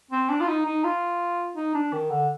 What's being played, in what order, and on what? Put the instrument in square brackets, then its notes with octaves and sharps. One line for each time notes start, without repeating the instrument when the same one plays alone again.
[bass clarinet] C4
D4
F4
D#4
D#4
F4
D#4
D4
D#3
D3